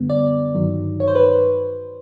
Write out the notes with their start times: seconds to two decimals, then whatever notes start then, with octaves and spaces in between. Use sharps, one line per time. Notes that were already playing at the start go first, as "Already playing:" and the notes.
Already playing: F#2 D3 G3 B3
0.10 D5
0.55 G2 D#3 F#3
1.00 C#5
1.08 C5
1.15 B4